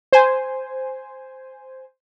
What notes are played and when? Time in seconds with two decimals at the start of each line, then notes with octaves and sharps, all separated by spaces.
0.13 C5 G#5